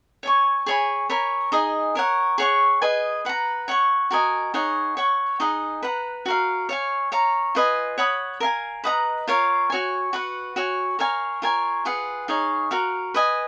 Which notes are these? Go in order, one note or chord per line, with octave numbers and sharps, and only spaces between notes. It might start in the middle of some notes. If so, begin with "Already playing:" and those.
C#5 G#5 C#6
G#4 C#5 G#5 B5
A#4 C#5 G#5 B5
D#4 G#4 D#5 G#5
A#4 C#5 F#5
G#4 C#5 F#5 C#6
G#4 B4 D#5 G#5
B4 F#5 A#5
C#5 F#5 C#6
F#4 A#4 D#5 G#5
D#4 G#4 C#5 F#5
C#5 F#5 C#6
D#4 G#4 D#5 F#5
B4 F#5 A#5
F#4 A#4 F5
C#5 F5 G#5
C#5 F5 A#5
F4 B4 D#5 G#5
C#5 F#5 B5 D#6
A#4 F5 G#5
B4 D#5 F#5 A#5
F4 A#4 C#5 F5
F#4 C#5 G#5
F#4 B4 F#5
F#4 C#5 G#5
A#4 C#5 F5 G#5
F4 A#4 C#5 G#5
F4 G#4 B4 F#5
D#4 G#4 C#5 F5
F#4 A#4 F5
B4 D#5 G#5